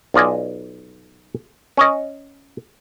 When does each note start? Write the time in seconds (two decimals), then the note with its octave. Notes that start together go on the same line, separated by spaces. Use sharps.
0.14 B1 F4 D5 D#5 G#5
1.77 C#4 C#5 D#5